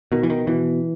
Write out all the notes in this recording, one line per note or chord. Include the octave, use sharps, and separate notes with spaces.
B2 D#3
E3
D#3
B2 E3